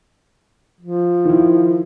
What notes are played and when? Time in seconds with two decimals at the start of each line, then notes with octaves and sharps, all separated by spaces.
0.81 F3
1.25 D#3 E4